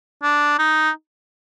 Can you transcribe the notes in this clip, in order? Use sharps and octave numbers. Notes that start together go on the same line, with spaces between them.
D4
D#4